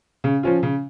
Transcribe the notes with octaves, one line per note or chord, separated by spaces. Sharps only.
C#3
F3 C#4 F4
C#3